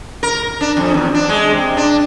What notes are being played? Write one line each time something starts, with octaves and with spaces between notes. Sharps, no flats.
A#4
D4
F2
E2
D4
G#3
C3
D4